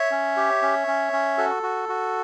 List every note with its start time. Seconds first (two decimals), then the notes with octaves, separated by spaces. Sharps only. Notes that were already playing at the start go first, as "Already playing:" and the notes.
Already playing: C#5 E5
0.11 C#4
0.37 G4
0.62 C#4
0.88 C#4
1.13 C#4
1.38 F#4 A4
1.63 F#4
1.89 F#4